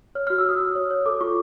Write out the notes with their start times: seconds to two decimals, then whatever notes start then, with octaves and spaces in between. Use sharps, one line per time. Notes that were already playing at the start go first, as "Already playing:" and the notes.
0.15 C#5 F6
0.27 F#4 F6
0.38 E6
0.46 F#4 D#6
0.60 F#4
0.75 C#5
0.91 C#5
1.06 A4 D6
1.21 F4 C#6